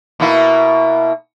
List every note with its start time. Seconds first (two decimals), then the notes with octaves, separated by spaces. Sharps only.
0.20 B2 A#3 E4